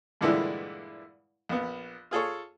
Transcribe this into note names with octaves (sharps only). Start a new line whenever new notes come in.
G2 A#2 D3 E3 G#3 E4
A#1 B3
F4 G#4 A4 C#5